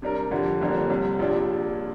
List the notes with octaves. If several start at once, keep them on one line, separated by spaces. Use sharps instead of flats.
C3 G3 D4 A#4
F2 D3 G3 D4
G1 F2 D3 G3 A#3
C2 C3 G3
A#1 A#2 G3 D4